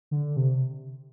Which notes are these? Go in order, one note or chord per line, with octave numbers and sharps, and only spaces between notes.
D3
C3